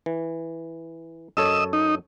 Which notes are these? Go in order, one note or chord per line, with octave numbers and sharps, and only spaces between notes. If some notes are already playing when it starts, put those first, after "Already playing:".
E3
F#2 A4 C#5 D#5 E6
D#4